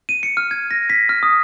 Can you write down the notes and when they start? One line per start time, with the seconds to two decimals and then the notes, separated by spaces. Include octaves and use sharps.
0.09 D#7
0.23 C#7
0.37 F6
0.51 G#6
0.71 A#6
0.90 B6
1.09 F6
1.23 D#6